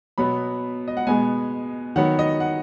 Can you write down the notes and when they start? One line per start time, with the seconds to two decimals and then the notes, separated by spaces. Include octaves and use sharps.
0.18 B2 F#3 B3 B5
0.88 D#5
0.97 F#5
1.07 B2 G#3 B3 G#5
1.96 D#3 F#3 B3 F#5
2.19 D#5
2.40 F#5